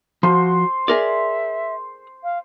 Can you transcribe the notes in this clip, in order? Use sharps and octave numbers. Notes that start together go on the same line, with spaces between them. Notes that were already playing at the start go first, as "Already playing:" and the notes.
F3 F#4 C5
G#4 A#4 D5 E5
F5